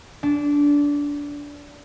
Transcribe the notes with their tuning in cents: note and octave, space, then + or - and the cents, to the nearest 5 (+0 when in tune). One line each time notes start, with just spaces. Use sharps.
D4 -20